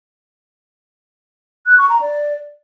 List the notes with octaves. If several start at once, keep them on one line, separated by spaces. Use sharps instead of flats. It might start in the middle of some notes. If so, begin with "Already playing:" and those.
F#6
C#6
A#5
D5